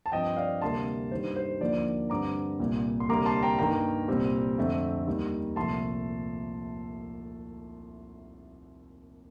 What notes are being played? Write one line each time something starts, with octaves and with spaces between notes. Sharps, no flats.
A5
G2 F3 C4 D#5 G5
D5 F5
D2 C3 G3 A#3 A5 C6
G2 D#3 G3 C5
C5
D#2 D3 F3 A#3 D5
G2 D3 G3 C4 A#5 D6
C2 A#2 G3
C6
D2 C3 G3 A#3 A#5 D6
A5 C6
G5 A#5
G2 D#3 A#3 G5 A#5
C2 A#2 G3 C4
F2 D3 A3 C4
D#2 D#3 G3
C2 A#2 F3 A3 A5 C6